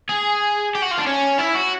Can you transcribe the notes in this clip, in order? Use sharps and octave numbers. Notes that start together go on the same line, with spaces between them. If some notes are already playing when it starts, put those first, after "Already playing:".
G#4
G4
F#4
F4
D4
C#4
E4
F#4